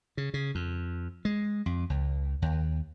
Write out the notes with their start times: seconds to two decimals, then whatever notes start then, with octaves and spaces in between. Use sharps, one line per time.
0.17 C#3
0.34 C#3
0.55 F2
1.25 G#3
1.66 F2
1.90 C#2
2.42 D#2